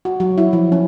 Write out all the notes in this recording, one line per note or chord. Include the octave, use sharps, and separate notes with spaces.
F#4
F#3
E4
F3
C#4